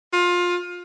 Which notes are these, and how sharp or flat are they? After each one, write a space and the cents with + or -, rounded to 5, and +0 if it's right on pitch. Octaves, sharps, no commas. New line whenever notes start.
F4 +20